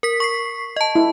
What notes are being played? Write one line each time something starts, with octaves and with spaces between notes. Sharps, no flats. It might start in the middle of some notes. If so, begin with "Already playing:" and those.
A#4 B6
C#6 B6 C7
D#5 A5
E4